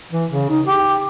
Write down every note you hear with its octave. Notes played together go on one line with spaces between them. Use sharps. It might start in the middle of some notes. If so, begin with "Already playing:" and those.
E3
C#3
D#4
G4